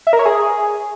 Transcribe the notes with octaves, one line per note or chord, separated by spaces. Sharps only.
E5
A#4
C#5
G#4